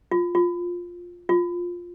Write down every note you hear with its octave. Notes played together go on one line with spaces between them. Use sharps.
F4
F4
F4